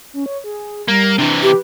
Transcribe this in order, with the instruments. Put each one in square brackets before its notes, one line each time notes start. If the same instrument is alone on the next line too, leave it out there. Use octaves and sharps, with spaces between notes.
[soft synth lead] C#4
C#5
G#4
[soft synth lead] G3 [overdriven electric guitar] A#3
[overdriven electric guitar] C3 E3 [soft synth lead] D4
[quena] G4 [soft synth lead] B4